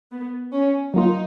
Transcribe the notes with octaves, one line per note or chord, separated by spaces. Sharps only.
B3
C#4
F#3 A#3 D#4 F4